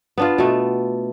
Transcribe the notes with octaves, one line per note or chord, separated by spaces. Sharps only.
B3 D4 F4
B2 A3